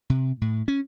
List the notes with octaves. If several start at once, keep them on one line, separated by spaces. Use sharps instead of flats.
C3
A2
C#4